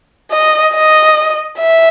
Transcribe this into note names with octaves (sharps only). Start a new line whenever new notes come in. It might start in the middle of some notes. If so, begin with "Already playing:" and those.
D#5
D#5
E5